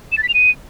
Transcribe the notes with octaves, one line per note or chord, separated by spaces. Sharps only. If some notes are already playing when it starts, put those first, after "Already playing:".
E7
A6
B6
F7
D#7